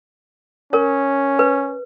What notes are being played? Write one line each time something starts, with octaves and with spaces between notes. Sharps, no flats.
C#4 A#4 C#5
B4